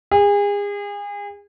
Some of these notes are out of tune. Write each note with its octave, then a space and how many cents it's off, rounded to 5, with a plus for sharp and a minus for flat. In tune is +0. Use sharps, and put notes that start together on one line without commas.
G#4 -35